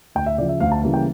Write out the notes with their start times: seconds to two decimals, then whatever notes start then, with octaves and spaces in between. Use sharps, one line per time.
0.15 D2 G5
0.26 E5
0.38 C#3 F3 D5
0.49 E5
0.60 D2 F5
0.72 A5
0.82 C#3 E3 G3 A#3
0.94 G5